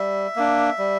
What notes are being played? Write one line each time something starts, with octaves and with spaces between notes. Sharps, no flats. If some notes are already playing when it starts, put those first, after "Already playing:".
Already playing: G3 E5
A#3 D4
G3